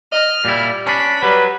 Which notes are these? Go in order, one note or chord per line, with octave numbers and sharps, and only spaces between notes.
D#5 F6
A#2 G3 E4
C#4 D4 B5
F#3 G3 B4